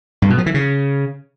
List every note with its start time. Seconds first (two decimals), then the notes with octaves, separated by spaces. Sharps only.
0.22 G2
0.30 B2
0.38 F3
0.46 E3
0.54 C#3